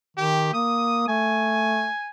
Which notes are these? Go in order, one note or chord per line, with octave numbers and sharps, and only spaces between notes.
D#3 G4
A#3 D#6
A3 G#5